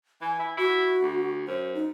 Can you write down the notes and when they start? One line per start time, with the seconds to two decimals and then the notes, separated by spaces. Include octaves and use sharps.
0.22 E3 G#5
0.40 E4
0.58 E4 F#4
1.02 D2
1.48 F#2 C5
1.75 D#4